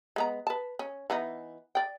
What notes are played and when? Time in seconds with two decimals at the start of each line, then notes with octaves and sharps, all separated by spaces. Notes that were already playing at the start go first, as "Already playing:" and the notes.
0.16 G#3 B3 A#5
0.47 B4 A5
0.79 C#4
1.10 E3 B3 D#4
1.75 D5 G5